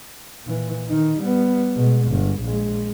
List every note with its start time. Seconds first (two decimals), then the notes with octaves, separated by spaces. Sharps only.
0.44 A#2 E3
0.88 D#3 D#4
1.19 G3 B3
1.76 B2 G#3
2.08 G1
2.42 A#1 G#3